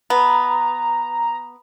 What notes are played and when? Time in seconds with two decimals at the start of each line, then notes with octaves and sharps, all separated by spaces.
0.10 B3 A#5